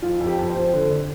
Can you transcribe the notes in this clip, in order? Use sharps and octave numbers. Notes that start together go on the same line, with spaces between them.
F2 F4
F2
G4
F2
F2 C5
D3
D3